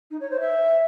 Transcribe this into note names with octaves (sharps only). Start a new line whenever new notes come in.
D#4
C#5
C5
E5